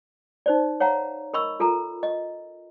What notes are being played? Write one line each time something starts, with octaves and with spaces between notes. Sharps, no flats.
D#4 C5 D5
C#5 F5 F#5 A#5
A#4 D#5 B5 C#6 E6
F4 A4 A#4 A#5
D#5